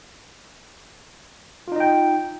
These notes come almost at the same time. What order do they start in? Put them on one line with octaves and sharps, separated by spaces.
F4 D#4 D#5 G5